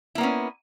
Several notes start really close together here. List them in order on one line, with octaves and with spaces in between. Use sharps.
E4 A#3 B3 C#4